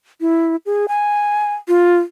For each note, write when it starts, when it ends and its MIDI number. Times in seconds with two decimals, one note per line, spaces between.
0.21 0.56 64
0.66 0.86 68
0.88 1.54 80
1.68 1.98 65